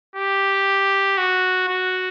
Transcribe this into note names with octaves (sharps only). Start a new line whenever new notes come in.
G4
F#4
F#4